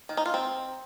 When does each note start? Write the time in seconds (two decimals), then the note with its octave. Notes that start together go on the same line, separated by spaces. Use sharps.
0.09 D#3
0.17 D#4
0.26 F4
0.34 C4